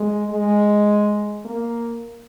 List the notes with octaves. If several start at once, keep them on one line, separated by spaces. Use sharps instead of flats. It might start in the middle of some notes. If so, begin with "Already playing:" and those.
Already playing: G#3
G#3
A#3